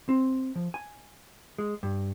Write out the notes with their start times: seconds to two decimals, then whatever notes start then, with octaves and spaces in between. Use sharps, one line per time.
0.09 C4
0.56 F3
0.74 G#5
1.58 G#3
1.83 G2